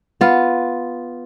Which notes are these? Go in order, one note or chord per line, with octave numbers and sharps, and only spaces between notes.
B3 F4